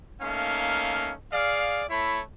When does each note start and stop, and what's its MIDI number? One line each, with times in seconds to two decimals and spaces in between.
0.21 1.12 57
0.21 1.12 58
0.21 1.12 61
0.21 1.12 63
0.21 1.12 77
1.31 1.82 68
1.31 1.82 74
1.31 1.82 77
1.89 2.20 57
1.89 2.20 64
1.89 2.20 73
1.89 2.20 83